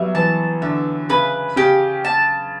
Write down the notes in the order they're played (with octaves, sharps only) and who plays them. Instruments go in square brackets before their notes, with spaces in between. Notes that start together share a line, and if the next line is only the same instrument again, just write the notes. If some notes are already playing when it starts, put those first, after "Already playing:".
Already playing: [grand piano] F#3 G3 B3 [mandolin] E5
[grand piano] E3 [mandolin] A5
[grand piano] D3 [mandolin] E5
[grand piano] C#3 [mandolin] B4
[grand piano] C#3 [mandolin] G4
[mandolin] A5